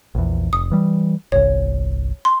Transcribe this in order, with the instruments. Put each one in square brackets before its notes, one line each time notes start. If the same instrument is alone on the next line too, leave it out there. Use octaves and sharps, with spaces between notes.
[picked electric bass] A#1 E2
[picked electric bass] F1 [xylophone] D#6
[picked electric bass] E3 G3
[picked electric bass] G1 C2 [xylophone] C#5
[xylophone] C6